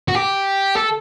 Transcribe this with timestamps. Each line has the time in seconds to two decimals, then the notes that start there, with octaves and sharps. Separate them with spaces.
0.08 F#4
0.15 G4
0.76 A4